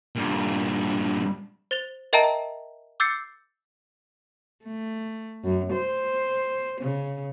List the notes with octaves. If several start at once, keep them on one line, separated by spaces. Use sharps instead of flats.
G2 A#2
C5 A6 F7 G7
A#4 D#5 E5 G5 A5 A#5
D6 E6 G6 A6 C7 C#7
A3
F#2
C5
C#3